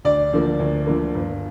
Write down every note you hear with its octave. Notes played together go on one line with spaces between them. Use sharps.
D2 D5
D3 F3 A#3
D2
D3 F3 A#3
G1